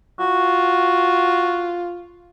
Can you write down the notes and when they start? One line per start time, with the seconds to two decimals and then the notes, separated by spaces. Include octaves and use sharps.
0.20 F4 F#4